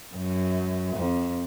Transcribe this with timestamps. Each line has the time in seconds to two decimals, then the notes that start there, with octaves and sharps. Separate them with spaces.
0.16 F#2
0.96 F2